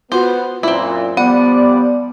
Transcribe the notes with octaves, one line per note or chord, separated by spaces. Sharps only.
B3 F4 F#4 B4 C5
F#2 A#2 C4 E4 F4
F3 G3 B3 D5 F#5